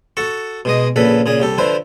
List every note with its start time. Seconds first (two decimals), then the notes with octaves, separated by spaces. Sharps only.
0.17 F#4 A4 A5 C#6
0.65 B2 G#3 D#5
0.96 A#1 A#2 C#3 A4 B4 B5
1.26 A#2 C#3 G#4
1.40 C2 G4 A4
1.58 D3 F3 E4 B4 C5